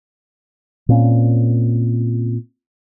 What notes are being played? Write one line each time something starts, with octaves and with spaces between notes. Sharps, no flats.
A#2 A#3 C4 C#4